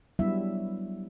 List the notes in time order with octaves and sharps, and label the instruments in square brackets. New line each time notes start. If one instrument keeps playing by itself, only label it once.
[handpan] F#3 G3 B3 D4 E4 E5